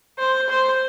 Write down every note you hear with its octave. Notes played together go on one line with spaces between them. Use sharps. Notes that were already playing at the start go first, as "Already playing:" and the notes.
C5
C5